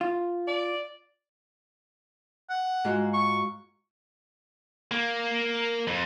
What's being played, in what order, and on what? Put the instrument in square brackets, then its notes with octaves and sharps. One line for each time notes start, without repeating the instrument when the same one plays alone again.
[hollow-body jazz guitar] F4
[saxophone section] D5
[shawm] F#5
[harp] G#2 F4 F#4
[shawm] C#6
[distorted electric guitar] A#3
F2